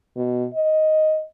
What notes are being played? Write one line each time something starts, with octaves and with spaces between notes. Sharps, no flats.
B2
D#5